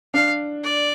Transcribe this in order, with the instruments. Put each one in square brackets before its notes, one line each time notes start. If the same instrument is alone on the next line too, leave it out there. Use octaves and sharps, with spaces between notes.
[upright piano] D4 [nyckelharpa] F5
[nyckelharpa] D5